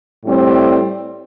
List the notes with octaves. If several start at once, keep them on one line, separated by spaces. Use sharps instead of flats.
A2 G3 C4